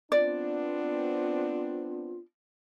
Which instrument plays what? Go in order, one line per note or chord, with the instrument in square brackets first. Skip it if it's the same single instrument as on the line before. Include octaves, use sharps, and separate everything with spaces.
[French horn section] B3 C4 D4 [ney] F4 [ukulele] D5